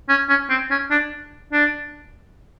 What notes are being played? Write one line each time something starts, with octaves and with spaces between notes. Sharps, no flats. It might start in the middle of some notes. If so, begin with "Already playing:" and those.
C#4
C#4
C4
C#4
D4
D4